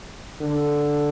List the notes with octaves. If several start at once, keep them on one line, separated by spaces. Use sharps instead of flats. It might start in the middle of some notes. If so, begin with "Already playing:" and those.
D3